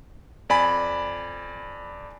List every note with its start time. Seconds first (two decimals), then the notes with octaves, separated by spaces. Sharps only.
0.49 F2 D5 G#5 B5